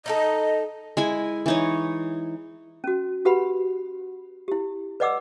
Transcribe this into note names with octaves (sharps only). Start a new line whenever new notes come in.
D#4 E4 A4 D#5
G#3 E4 G#5
E3 D#4 C#5
C#4 F#4
F#4 G4 B4 F#5 B5
E4 G4
B4 D5 D#5 F#5 D6 E6